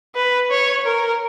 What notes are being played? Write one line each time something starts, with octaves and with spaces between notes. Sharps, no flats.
B4
C#5
A#4